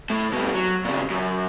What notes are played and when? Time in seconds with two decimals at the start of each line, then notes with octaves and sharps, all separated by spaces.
0.10 A2 A3
0.32 B2 G3
0.54 F#3
0.85 A#2 C#3
1.10 F#2